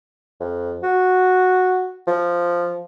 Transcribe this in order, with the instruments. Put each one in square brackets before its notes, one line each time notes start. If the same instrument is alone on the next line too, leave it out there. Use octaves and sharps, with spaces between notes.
[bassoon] F2
F#4
F3